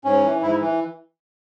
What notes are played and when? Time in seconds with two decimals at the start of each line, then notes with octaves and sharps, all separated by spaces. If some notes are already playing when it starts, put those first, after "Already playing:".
0.04 G#2 C#4
0.24 E3
0.42 G#2 E4
0.61 E3